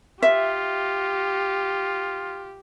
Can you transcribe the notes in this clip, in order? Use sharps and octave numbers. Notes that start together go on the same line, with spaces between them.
F4 G4 E5